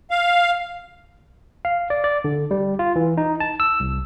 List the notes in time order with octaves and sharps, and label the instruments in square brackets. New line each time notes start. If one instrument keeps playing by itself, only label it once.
[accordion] F5
[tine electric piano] F5
D5
D5
D3
G3
F4
E3
D#4
A5
E6
C2